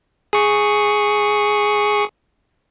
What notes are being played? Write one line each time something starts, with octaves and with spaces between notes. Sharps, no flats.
G#4 C#6